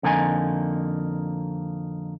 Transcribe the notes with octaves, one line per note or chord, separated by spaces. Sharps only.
F2 D3 A#3 D#4 G#5